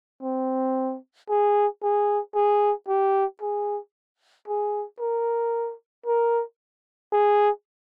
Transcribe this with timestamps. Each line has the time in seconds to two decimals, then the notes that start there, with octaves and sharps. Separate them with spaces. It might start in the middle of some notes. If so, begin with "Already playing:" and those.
0.23 C4
1.30 G#4
1.82 G#4
2.35 G#4
2.88 G4
3.41 G#4
4.48 G#4
5.00 A#4
6.06 A#4
7.12 G#4